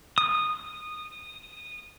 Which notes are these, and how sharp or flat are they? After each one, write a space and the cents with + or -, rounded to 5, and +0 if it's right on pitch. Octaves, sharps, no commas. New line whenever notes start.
D#6 -15